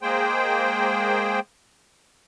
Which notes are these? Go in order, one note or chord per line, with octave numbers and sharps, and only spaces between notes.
G#3 A#3 G#4 C5 G5